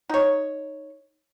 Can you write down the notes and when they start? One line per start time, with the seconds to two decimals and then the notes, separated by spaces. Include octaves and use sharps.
0.10 D#4 C#5